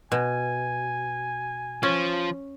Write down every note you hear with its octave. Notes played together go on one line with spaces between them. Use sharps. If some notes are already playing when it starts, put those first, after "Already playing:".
B2 G#5
F3 C#4